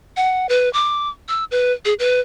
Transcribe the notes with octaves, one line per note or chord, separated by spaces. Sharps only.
F#5
B4
D6
E6
B4
G#4
B4